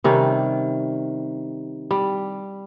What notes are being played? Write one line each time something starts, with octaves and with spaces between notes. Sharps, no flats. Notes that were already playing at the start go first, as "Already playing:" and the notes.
C3 D#3 G3 C#4
G3